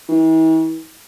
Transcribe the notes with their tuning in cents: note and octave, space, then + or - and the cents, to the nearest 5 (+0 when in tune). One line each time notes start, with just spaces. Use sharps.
E3 -45